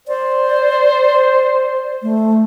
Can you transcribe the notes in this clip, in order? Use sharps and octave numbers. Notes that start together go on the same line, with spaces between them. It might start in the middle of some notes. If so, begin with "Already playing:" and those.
C5 D5
A3